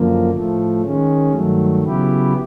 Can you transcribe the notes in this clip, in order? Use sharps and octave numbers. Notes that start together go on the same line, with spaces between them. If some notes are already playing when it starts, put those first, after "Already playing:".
Already playing: F#2 D3 F3 A#3
A2 F3 A3
D#3 G#3 C#4
G2 D#3 F#3 A3
C#3 F#3 B3 E4 G4